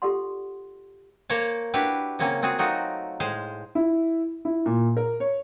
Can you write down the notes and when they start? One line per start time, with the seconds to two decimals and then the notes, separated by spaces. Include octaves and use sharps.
0.02 F4 G4 A4 D5 F#5 C6
1.30 A#3 A#4 C5 C#5 F5 A5
1.74 D4 E4 F#4 G4 B4
2.19 C#3 F#3 A#3 C4 C#4
2.42 C4 F4 F#4 G#4
2.59 F#3 A3 C4 D#4 F4 F#4
3.20 A2 G#3 G#4 C5 F5
3.75 E4
4.45 E4
4.66 A#2
4.97 A#4
5.20 C#5